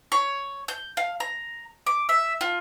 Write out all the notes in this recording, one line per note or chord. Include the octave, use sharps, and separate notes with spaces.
C#5
G6
F5
A#5
D6
E5
F4